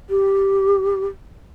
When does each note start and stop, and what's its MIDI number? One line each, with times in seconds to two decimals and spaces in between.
0.09 1.05 67